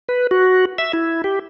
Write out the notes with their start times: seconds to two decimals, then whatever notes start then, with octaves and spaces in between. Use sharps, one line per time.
0.09 B4
0.31 F#4
0.78 E5
0.93 E4
1.24 G4